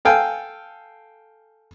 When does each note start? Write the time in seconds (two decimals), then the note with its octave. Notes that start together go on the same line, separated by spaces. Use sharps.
0.05 A4 F5 G5 G#5